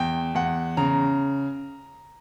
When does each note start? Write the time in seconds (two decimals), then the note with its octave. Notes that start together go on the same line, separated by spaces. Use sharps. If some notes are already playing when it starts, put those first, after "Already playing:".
Already playing: E2 G5
0.35 E2 F#5
0.77 C#3 A#5